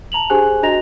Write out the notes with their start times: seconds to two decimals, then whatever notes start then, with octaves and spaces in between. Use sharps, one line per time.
0.12 A5 A#5 F7 F#7
0.30 D4 G4 G#4 C5 G#5 F#6
0.63 D4 F#4 D#5 A#5 A#6 F7